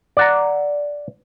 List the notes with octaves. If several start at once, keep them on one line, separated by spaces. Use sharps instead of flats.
D5 F#5 A#5